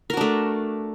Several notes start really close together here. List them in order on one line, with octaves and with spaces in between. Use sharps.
A#4 F#4 D4 A3